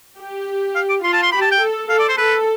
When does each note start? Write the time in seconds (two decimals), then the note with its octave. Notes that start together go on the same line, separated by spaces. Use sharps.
0.18 G4
0.75 F5
0.89 D6
1.04 F4 C6
1.13 A5
1.23 C6
1.32 G4 B5
1.42 A5
1.51 G5
1.61 A4
1.89 A4 F5
1.99 D5
2.09 C5
2.18 A4 B4